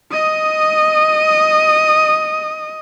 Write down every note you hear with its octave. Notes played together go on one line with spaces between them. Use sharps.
D#5 D#6